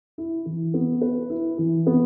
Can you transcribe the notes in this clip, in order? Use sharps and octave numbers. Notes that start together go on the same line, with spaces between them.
E4
E3
B3
B4
E4
E3
B3